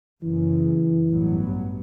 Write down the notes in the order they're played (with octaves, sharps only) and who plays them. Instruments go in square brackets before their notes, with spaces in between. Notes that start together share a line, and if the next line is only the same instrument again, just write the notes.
[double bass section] F#1 F#2 C#3 [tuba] E3
[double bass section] A1 G2 F#3 B3